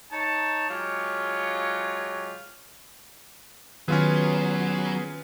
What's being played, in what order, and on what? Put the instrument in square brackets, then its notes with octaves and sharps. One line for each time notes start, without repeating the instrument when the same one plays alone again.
[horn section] D#4 C#5 A5
F#3 G#3 F4 G4 C#5
[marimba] D#3 [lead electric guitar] F#3 [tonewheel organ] B3 G#4 [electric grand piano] C#4 F4 B4